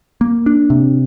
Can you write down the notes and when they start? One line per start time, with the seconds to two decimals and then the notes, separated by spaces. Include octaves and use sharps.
0.21 A#3
0.46 D4
0.70 C3